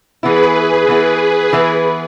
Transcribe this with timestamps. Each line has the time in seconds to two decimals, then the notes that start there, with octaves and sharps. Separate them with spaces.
0.23 E3 B3 E4 G#4 B4
0.88 E3 B3 E4
1.53 E3 B3 E4